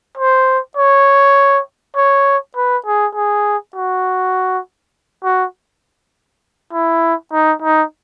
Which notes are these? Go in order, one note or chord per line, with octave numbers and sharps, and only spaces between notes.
C5
C#5
C#5
B4
G#4
G#4
F#4
F#4
E4
D#4
D#4